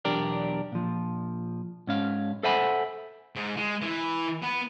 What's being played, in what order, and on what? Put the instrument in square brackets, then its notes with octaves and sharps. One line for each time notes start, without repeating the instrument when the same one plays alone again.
[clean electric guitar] B1 E2 D4 G4 A#4 D5
A#2 F3
G#2 C#4 F5
A4 C5 E5 F#5 G#5 B5
[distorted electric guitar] G#2
G#3
E3 E4
B3